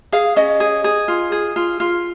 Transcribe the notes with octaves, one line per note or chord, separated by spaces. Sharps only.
G#4 F5
C#4 D#5
G#4
G#4
F4
G#4
F4
F4